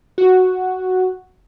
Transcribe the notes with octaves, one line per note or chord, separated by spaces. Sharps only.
F#4